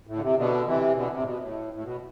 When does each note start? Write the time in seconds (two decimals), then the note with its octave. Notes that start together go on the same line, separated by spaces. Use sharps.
0.07 A2
0.16 D3
0.22 C3
0.37 B2 D3
0.66 C3 E3
0.95 B2 D3
1.11 C3
1.20 A2
1.25 B2
1.40 A2
1.73 A2
1.83 B2